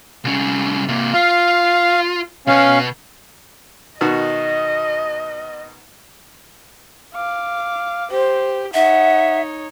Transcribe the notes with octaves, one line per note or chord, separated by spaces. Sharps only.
C2 C#4
C3 A#3
F4 F5
B2 C#4 B4 F5
B2 D#3 F#4 D#5
F5 D6
G4 C5
D#4 C#5 E5 F#5